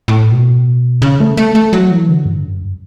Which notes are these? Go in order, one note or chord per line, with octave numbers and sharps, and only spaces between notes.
A2
B2
C#3
A3
A3
A3
F#3
E3
D3
G2
F#2